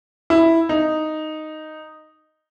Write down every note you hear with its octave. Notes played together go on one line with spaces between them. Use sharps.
E4
D#4